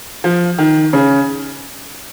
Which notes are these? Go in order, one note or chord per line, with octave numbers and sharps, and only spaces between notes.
F3
D#3
C#3